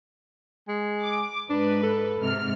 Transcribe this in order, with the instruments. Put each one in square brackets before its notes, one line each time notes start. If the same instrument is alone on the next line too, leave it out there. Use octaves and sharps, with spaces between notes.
[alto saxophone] G#3
[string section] D6
[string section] G#2 B4 [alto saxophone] D4
[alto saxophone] A4
[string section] G#2 C3 F6